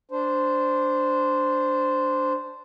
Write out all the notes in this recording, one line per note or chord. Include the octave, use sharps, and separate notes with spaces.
D4 C5